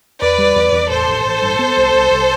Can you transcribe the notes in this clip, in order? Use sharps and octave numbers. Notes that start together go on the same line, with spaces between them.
E2 B4 D5
G3
E2
E2
A1 A4 C5
A1
A1
G2
B3
C2
C2
C2